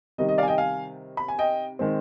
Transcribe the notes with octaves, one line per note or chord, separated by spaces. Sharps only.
C3 D#3 G3 D#5
D#5
D5 F5
G#5
D#5 G5
F5 G#5
B5
G#5
D#5 G5
D#3 G#3 C4